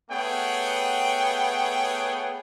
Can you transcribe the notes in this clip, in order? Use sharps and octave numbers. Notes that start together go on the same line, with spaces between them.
A3 B3 G#4 C#5 F#5 G5